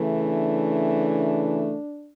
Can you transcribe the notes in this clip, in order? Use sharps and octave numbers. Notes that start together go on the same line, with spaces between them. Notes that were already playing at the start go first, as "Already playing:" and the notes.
Already playing: C#3 E3 A3
D4